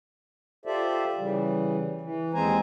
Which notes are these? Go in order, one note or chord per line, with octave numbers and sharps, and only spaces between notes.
F4 G4 A4 C5 D5 E5
C#3 E3 G3
E3
D#2 G#3 C4 C5 G#5 A#5